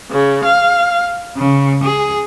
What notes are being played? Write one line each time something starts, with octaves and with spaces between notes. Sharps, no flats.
C#3
F5
C#3
G#4